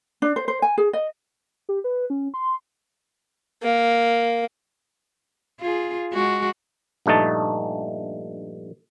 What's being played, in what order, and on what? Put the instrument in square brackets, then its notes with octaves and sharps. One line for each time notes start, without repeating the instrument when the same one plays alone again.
[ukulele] D4
C5
C5
G#5
G#4
D#5
[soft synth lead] G4
B4
C#4
C6
[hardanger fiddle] A#3
[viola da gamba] F4 G#4
G#3 F#4
[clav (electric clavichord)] A#1 G2 A3 D#4 A5